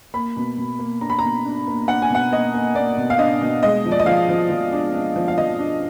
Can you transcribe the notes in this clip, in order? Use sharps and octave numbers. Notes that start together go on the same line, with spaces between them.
A#3 B5
B2
B2
A#3
D4 A#5
B5
B2 A#5
D4
A#3
D4 F#5
G#5
B2 F#5
A#3 D#5
A#3
A#3 D5
B2
F5
D4 D#5
B2
G#3 D#5
F3
D5
D#5
F3 F5
F3
F3
D4
D4
F3
F5
F3 D#5
D4